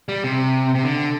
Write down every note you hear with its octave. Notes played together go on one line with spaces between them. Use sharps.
G3
C3
C3
D3